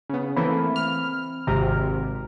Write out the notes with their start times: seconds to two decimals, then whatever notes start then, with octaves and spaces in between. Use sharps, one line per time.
0.10 C#3 B3
0.37 E3 A3 A#3 C4 B5
0.76 F6
1.47 G#1 G#2 C3 A#5 F6